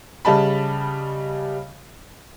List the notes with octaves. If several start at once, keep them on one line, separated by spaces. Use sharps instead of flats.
C#3 G3 D#5 A5 B5